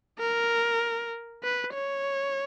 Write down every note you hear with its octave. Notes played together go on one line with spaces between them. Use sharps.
A#4
B4
C#5